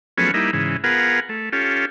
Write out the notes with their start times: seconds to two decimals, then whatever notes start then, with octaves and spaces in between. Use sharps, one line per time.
0.18 F3 F#3 A3 B3 C#4 G#4
0.34 G3 A#3 D#4 E4
0.53 G#2 C#3 E3
0.84 B3 F4 G#4 A#4 F#5
1.29 A3
1.52 C#4 F4 G4 A4